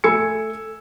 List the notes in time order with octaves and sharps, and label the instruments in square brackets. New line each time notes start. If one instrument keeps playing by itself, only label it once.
[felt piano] A3 A4 G#5 E6 G#6 C#7